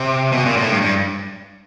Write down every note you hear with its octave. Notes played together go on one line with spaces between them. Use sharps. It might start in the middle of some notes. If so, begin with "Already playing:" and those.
Already playing: C3
B2
A#2
A2
G2
G2